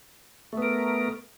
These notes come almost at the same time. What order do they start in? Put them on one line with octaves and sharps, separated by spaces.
A3 B3 A#4